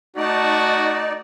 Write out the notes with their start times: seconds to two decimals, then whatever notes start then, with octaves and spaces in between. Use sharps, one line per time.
0.16 A3 D#4 F#4 D5 A5